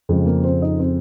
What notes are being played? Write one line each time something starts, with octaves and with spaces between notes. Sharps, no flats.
F2 C#3 F3 G#3 G#4
A#3 A#4
C4 C5
D#4 D#5
C4 C5